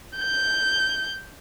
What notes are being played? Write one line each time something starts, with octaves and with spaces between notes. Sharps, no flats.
G6